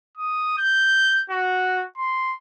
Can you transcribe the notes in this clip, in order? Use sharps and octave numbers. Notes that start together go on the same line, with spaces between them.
D#6
G6
F#4
C6